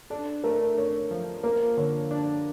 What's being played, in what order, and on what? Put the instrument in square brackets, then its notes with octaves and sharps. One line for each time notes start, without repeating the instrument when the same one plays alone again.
[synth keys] D4 [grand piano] A4
[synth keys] A3 [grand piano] A#4
[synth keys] A3 [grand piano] C#5
[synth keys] F3
[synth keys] A#3 [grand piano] A#4
[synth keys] D3 [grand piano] C#5
[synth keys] D4